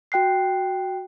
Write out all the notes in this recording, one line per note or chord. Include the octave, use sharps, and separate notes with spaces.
F#4 G5 F#6 C7